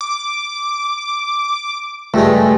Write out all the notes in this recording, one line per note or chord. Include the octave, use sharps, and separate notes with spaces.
D6
C#2 G2 G#3 A3